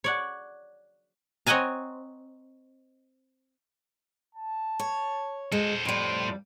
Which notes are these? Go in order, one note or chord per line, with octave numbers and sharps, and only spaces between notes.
C#5 D5 F#5
C4 C#5 D#5 F#5 G#5 A#5
A5
C#5
G#3 A4 C5
F2 A2 G3 C5